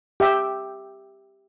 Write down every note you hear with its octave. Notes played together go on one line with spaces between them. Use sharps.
G4 E5 G5